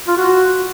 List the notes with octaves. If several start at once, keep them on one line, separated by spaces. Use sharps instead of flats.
F4
F#4